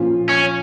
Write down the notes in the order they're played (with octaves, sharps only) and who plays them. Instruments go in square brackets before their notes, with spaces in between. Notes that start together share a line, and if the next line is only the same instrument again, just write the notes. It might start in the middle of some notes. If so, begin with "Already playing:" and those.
Already playing: [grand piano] A#2 F3 C#4 F4
[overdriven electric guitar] C#4